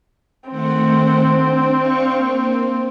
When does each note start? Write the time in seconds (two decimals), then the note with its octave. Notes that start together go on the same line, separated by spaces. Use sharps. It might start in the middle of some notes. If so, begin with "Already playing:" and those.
0.50 D#3 A3 C4 F#5
1.43 D4
1.76 D4 F5 C#6
2.15 A#3